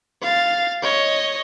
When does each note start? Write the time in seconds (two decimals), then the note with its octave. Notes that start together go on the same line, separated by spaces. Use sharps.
0.22 F5 A6
0.82 C#5 D#5